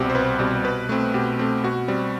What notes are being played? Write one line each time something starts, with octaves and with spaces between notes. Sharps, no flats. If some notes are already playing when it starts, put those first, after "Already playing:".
Already playing: C2 B2 G3 C4 G4
C5
C2 B4
B2 G3 C4
B2 B4
A3 C4
B2 G4
A3 C4
B2 F#4
G3 C4